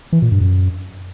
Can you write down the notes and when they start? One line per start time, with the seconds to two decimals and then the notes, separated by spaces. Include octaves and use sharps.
0.13 E3
0.22 A#2
0.32 G2
0.41 F#2